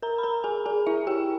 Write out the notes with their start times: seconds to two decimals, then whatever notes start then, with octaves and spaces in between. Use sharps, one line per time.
0.02 A#4 A#5
0.18 B5
0.23 A#4 A#5
0.44 G#4 G#5
0.65 G#4 G#5
0.86 E4 E5
1.07 G4 G5